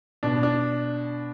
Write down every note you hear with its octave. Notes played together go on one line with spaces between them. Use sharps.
B2 D4
D4